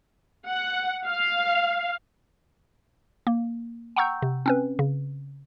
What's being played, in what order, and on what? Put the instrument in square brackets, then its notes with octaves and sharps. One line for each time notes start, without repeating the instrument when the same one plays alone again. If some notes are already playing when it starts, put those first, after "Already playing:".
[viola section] F#5
F5
[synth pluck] A#3
F#5 G5 A#5 C#6 E6 G6
C3
C4 C#4 B4
C#3